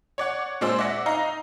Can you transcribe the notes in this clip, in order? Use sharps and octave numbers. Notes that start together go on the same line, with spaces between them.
C#5 D5 F#5
A#2 G#3 D4 F4 C5 E6
D5 E5 F#5 A#6
D#4 F5 A#5